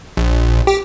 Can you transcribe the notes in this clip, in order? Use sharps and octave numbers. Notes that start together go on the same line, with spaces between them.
A#1
G4